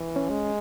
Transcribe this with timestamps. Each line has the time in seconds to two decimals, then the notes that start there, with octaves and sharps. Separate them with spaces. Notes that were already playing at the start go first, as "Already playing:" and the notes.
Already playing: E3
0.16 C#4
0.29 G#3